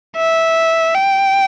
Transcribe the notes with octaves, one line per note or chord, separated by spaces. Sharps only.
E5
G5